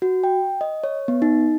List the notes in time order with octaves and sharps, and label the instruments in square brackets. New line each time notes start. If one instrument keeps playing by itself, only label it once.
[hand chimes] F#4
G5
D#5
C#5
B3
D#4